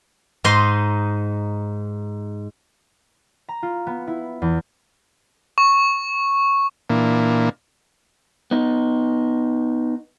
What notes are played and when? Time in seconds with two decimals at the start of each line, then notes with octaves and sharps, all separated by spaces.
0.44 G#2 D#4 D#5 C6
3.49 A#5
3.63 F4
3.87 B3
4.07 E4
4.42 E2
5.58 C#6
6.90 A#2 E3 A#3 D4
8.51 B3 D#4